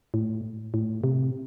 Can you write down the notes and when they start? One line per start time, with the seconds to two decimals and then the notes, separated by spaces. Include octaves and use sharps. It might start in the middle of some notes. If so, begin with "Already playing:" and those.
0.14 A2
0.74 A2
1.04 C3